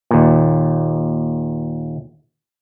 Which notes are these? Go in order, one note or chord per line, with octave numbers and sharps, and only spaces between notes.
D#2 A#2